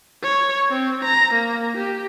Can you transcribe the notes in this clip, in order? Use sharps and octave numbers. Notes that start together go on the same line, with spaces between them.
C#5
C4
A#5
A#3
G4